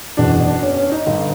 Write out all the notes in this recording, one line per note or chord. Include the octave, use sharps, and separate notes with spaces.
F#1 E2 B2 D4
D4
C#4
C#4
D#4
G1 G2 D3